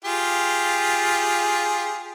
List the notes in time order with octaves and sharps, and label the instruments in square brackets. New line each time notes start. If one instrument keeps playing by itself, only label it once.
[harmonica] F4 G4 G#4